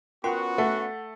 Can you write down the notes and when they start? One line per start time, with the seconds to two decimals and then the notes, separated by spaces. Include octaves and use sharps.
0.24 B3 C#4 F4 F#4 A#4 G5 C6
0.58 A3 F#5